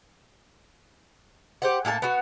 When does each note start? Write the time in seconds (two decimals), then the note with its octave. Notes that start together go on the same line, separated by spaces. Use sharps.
1.62 G4 C5 F#5
1.85 A2 A#3 G4 A5
2.02 B3 F#4